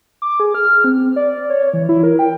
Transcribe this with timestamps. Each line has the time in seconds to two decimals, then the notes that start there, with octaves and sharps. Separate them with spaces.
0.22 D6
0.40 G#4
0.54 F6
0.84 C4
1.16 D5
1.50 C#5
1.74 E3
1.89 E4
2.03 A#4
2.19 G5